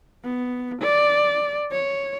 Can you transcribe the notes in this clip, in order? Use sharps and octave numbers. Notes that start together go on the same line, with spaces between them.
B3
D5
C#5